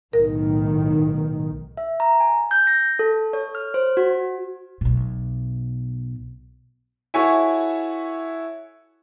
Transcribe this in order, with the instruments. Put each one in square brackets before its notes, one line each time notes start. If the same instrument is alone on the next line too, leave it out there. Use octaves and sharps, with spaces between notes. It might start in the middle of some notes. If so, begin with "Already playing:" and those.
[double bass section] B1 A2 D#3 [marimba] A#4
[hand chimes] E5
A#5
G#5
G6
A#6
A4
C#5
F6
C5
F#4
[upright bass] B1 B2
[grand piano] E4 F#4 A4 C#5 E5 G#5